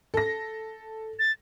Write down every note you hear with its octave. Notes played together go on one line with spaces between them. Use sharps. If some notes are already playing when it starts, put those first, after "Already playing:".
A4 A#6
A6